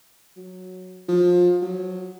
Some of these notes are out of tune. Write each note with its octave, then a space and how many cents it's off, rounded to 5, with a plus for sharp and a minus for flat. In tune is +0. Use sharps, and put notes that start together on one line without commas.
F#3 -10
F3 +25
F#3 -5